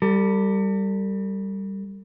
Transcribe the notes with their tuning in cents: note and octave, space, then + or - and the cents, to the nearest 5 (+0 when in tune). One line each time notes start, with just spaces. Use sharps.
G3 +0 A4 +45